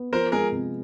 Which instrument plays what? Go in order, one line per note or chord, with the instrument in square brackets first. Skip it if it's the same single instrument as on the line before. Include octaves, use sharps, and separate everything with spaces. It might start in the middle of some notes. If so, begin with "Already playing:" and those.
Already playing: [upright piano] B3
[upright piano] F3 [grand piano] A#4 C5
[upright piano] G#3 [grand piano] G#4 A#4
[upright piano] C3